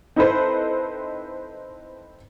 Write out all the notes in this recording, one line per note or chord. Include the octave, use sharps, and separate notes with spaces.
C4 D#4 E4 A4 B4 C5